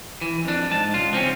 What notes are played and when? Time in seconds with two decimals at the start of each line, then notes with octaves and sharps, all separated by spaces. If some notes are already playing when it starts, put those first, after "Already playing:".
0.21 E3
0.45 F2 D4
0.71 G#2 A5
0.94 C#2 F4
1.13 F3 C4 C#4